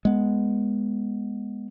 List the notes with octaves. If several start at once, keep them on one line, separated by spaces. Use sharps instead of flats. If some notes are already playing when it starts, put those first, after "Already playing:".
G#3 B3